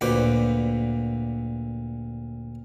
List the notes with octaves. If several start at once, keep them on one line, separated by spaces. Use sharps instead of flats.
D2 A#2 D3 B4 C5 D6